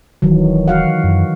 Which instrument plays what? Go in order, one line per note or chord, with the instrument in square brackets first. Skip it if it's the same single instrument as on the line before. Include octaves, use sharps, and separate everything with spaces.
[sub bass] D1 [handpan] D#3 E3 F#3
[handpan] F#4 F5 F#5
[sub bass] F#2